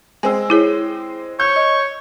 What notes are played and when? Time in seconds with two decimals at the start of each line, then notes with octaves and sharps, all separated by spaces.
0.23 G#3 C4 G#5 E6
0.50 E4 G#4 C#5
1.40 C#5 G6
1.56 D#5